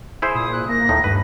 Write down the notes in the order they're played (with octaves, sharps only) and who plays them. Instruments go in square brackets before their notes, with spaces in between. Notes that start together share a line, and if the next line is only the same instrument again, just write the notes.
[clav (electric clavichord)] E4 G#4 C5
[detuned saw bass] A#2 [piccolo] D#6
[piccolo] F#6
[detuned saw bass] A#3 [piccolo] A#6
[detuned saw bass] D#2 [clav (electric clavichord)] A2 D#4
[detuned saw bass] G2 [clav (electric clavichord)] B4